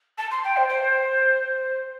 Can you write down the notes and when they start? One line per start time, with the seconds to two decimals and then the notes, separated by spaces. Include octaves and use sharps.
0.18 A5
0.31 C6
0.44 G5
0.56 C5
0.69 C5